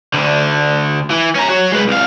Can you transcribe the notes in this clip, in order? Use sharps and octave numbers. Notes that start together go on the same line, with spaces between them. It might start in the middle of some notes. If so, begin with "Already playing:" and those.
D2 D3
E3
C#4 A#5
F#4 C#5
G#3 B4
C2 F5